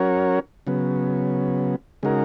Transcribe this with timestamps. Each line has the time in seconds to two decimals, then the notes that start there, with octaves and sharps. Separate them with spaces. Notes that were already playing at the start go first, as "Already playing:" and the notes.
Already playing: F#3 C#4 F#4 A#4 C#5
0.67 C#3 F#3 B3
2.03 C#3 G#3 D#4 F#4 A#4